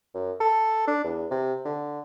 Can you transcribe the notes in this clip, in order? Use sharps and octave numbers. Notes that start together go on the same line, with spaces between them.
F#2
A4
D4
E2
C3
D3